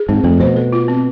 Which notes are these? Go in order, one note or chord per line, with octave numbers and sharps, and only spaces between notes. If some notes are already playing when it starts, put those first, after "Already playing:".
Already playing: G#4
G#2 C4
F2 A3
B2 C5
A4
F4
C4